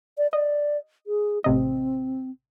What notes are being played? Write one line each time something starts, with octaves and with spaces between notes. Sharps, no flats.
D5
D5 D#5
G#4
A1 C3 C4 D#5